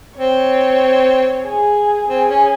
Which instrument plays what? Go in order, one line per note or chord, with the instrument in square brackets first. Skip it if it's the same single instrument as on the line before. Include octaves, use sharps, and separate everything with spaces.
[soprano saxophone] C4 [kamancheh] C#5
[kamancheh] G#4
[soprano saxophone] C4 [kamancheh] G#4
[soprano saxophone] C#4